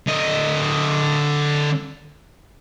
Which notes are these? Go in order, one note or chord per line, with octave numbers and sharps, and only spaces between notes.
D3 D#5